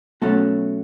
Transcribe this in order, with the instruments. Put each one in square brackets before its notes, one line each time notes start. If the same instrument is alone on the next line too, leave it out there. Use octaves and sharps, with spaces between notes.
[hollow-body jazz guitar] B2 F#3 C#4 F#4 A4 [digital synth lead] A3